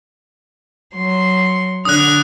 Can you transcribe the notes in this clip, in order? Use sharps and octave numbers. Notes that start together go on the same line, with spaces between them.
F#3 C6
D3 D#6 F6 F#6